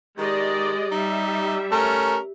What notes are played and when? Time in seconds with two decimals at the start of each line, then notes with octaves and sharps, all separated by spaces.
0.18 D#3 G#3 G4 D5 D#5
0.92 G3 D#4 E5
1.72 A3 C#4 A#4